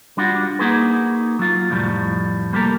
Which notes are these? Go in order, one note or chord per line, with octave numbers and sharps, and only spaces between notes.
G3 D4 F4 F#4
A#3 D#4 F#4 G#4 B4
F#3 F4
C2 F2 A2 G3
G3 A#3 G4 A4 A#4